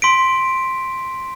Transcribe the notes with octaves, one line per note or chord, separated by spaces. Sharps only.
C6 B6 D7